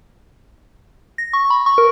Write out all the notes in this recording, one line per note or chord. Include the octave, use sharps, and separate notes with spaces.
A#6
C#6
B5
C#6
A#4